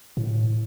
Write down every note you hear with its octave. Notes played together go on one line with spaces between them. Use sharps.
A2